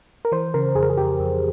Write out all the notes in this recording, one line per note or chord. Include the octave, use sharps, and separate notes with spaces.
A#4
E3 C5
C#3 A#4
F2 G#4
A#4
G#4
F2 G4
F2